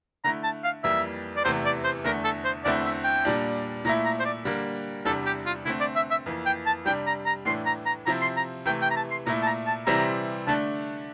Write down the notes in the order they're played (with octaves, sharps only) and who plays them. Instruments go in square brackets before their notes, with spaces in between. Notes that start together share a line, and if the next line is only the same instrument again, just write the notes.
[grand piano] D3 A3 E4 [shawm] A#5
[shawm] A5
F5
[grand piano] F2 E3 G3 A#3 [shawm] E5
[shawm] D5
[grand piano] E2 C3 E3 A3 [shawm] C5
[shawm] D5
C5
[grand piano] E2 D3 A3 [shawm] A#4
[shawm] A4
C5
[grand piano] E2 D3 A3 C4 E4 [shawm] D5
[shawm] E5
G5
[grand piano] A#2 G3 D4
[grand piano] A#2 A3 E4 [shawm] A#5
[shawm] A#5
C5
D5
[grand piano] D3 G3 A#3
[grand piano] E2 C3 G3 D4 [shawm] A4
[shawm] G4
F4
[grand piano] D3 A3 C4 [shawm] E4
[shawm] D5
E5
E5
[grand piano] F2 E3 A#3
[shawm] G5
A5
[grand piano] C3 G3 D4 [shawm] G5
[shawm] A#5
A#5
[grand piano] A2 E3 A3 D4 [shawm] C6
[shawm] A#5
A#5
[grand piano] C3 F3 C4 E4 [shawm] A#5
[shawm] C6
A#5
[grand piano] C3 E3 A3 [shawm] G5
[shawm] G5
A#5
A5
C6
[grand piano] A#2 A3 E4 [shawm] A#5
[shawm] A5
A#5
A5
[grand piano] C3 E3 G3 C4 E4 [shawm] A#5
[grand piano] D3 A3 D4 [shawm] A5